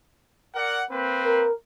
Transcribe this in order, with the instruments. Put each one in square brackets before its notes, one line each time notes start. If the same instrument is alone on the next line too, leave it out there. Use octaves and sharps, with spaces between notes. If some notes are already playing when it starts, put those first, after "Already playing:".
[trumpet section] A#4 D5 F#5
A#3 C4 B4
[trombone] A#4